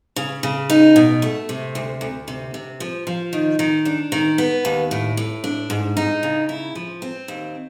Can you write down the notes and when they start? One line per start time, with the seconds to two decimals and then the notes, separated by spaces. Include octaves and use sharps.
0.16 C#3
0.43 C#3
0.70 D#4
0.96 B2
1.22 A3
1.49 C3
1.75 D2
2.01 D2
2.28 C3
2.54 C3
2.80 F3
3.07 F3
3.33 D#3
3.59 D#3
3.85 D4
4.12 D#3
4.38 B3
4.65 D#2
4.91 A2
5.17 A2
5.44 D4
5.70 G#2
5.97 D#4
6.23 C#3
6.49 E4
6.75 F3
7.02 C4
7.28 D#2